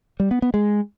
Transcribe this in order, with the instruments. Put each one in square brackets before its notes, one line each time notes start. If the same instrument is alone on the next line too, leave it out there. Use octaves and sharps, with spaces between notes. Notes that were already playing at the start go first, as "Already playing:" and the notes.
[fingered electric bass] G3
B3
B3
G#3